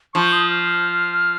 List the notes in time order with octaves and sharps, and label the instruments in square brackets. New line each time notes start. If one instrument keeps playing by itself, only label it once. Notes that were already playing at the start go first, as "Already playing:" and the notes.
[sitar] F3 [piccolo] C#6
[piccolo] D#6
F6